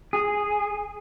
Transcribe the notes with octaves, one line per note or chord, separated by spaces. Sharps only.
G#4